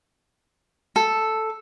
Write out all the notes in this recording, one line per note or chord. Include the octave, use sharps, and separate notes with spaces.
A4